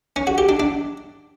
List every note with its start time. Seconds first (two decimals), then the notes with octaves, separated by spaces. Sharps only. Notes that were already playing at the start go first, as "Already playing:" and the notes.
0.16 C#4
0.27 F#4
0.38 G4
0.49 D4
0.60 D4